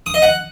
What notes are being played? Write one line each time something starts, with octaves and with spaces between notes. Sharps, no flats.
D#6
D#5
F#5